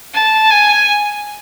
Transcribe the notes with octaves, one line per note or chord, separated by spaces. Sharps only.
A5
G#5